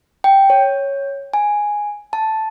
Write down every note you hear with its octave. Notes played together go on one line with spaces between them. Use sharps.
G5
C#5
G#5
A5